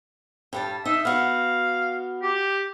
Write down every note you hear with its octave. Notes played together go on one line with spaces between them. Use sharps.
G2 G3 A5
D#4 E5
B3 F#4 F5
G4